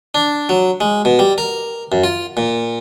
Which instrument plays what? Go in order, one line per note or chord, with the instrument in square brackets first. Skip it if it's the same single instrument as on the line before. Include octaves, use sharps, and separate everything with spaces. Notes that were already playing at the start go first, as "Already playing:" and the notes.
[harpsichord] D4
F#3
G#3
B2
G3
A#4
F#2
F4
A#2